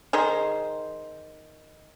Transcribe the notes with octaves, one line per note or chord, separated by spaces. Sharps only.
D#3 G#4 C5